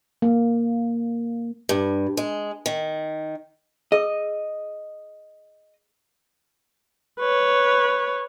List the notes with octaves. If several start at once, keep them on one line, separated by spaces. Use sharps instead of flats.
A#3
G2
G#3
D#3
G#4 D#5 E6
B4 C#5